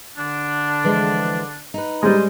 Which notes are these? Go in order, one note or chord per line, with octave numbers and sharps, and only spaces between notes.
D3 D4
E3 F3 G#3
D#4 B4
G3 G#3 C5 D#5